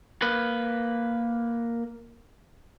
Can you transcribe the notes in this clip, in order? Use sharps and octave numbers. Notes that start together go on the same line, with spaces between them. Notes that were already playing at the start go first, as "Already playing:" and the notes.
A#3 B4